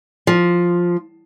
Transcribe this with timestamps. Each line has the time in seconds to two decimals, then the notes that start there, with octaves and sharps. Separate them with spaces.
0.27 F3